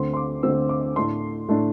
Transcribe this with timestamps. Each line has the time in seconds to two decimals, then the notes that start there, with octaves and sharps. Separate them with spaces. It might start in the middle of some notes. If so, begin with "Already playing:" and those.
Already playing: D2 D3 C4 C6
0.14 C6
0.17 D6
0.43 D2 D3 C4 E6
0.69 D6
0.96 A2 A3 D4 C6
1.48 A2 A3 D4